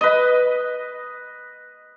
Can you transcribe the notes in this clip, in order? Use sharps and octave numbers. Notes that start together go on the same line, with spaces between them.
B4 D#5